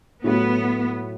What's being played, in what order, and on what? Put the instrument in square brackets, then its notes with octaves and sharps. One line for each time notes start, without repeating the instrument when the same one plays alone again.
[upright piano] A2 F#3 A3 F#4 [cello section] B3